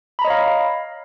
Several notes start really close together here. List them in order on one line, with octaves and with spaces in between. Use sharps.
B5 A#5 D#5 C#5 F5